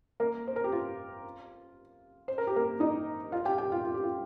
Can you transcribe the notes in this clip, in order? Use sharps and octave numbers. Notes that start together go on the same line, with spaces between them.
A#3 A#4
C5
A#4
G4
F4
C5
A#4
G4
A#3 A#4
D#4 D#5
F4 F5
G4 G5
G4 G5
F4 F5
F4
G4
F4